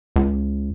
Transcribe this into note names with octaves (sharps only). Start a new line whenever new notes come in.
C#2